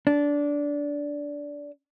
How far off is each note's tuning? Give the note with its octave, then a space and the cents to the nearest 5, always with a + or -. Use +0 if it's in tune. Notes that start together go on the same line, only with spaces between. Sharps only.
D4 -15